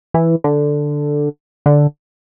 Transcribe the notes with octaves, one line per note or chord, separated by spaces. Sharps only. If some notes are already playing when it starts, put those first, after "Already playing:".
E3
D3
D3